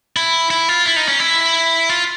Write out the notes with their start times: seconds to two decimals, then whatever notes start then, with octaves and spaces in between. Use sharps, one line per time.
0.17 E4
0.50 E4
0.69 F4
0.86 E4
0.96 D#4
1.08 C#4
1.20 E4
1.89 F4